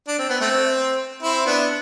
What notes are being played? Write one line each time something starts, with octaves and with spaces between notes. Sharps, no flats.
D4
C4
B3
A3 C4
C4 E4
B3 D4